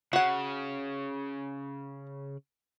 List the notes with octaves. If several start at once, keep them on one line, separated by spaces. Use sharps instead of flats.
C#3 F#4 F#5